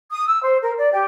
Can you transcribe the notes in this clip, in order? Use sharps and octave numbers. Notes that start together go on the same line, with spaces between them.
D#6
E6
C5
A#4
D5
G4